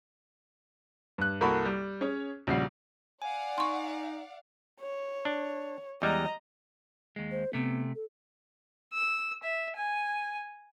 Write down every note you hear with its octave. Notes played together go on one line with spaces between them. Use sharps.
G2 F#6
C2 A#3 F#4 A4 B5 C#6
G3
C#4 G#4 C#5
A#1 C#3 G3 F#4 C7
D5 F5 F#5 G#5
D#4 C6 C#6
C#5
D4
E2 G3 G#3 D#5 A#5
D#2 G#3
C5
C3 A3 B3
A4
E6
E5
G#5